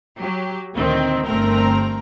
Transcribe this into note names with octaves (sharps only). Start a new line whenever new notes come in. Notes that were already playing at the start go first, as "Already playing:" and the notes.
F#3 G4
D2 A#2 D#3 C4
G1 A3 C4 A#4 A#5